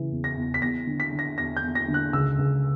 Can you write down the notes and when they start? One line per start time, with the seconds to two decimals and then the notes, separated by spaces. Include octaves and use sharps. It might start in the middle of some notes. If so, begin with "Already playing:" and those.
Already playing: C#3 E3
0.11 E2
0.24 A#6
0.37 E2
0.54 B6
0.62 E2 A#6
0.87 D3
1.00 B6
1.12 D3
1.19 A#6
1.38 E2 A#6
1.57 G6
1.63 E2
1.75 A#6
1.88 D3
1.94 F#6
2.13 C#2 E6
2.39 C#2